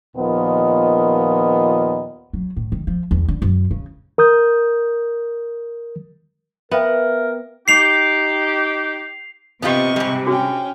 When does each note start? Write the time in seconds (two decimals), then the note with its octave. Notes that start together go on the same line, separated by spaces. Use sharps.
0.17 D#2 A#2 F3 B3 D#5
2.33 F#3
2.56 A2
2.72 D#3
2.87 F3
3.11 E2
3.28 D3
3.42 F#2
3.71 C#3
4.18 A#4 D#6 G6
6.71 B3 A#4 E5 F5 G5
7.68 D#4 G4 C7 F7
9.62 C3 B3 F4 G4 D#5 C#6
9.96 G#2 G3
10.26 C#4 D4 F#4 G#4 G5